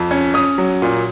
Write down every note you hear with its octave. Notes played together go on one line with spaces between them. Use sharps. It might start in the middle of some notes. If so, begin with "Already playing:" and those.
Already playing: F2
C#4
C#4 D#6
F#3
A#2